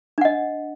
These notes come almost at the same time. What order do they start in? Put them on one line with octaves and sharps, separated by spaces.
D4 F#5 D#5